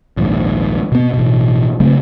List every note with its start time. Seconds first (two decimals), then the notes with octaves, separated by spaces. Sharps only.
0.17 A#1 D#2 G#2
0.92 B2 B3
1.14 A1 B2
1.80 C#3 F#3 A3 C4